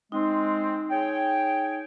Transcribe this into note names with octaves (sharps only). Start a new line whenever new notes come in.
G#3 C4 D#4
G#4 C#5 G5